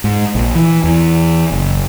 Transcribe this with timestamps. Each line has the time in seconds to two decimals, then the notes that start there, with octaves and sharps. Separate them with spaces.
0.04 G#2
0.35 A#1
0.55 E3
0.84 E2
1.52 F#1